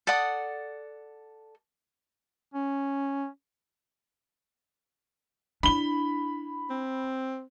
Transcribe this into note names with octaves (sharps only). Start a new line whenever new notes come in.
A4 D5 F#5 D#6
C#4
D4 E4 B5 G7
C4